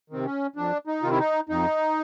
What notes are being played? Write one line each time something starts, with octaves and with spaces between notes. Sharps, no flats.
C3 D#3 C4
C#4
F2 D4
D#4
C3 D#3 F4
E4
D#4
F2 D#4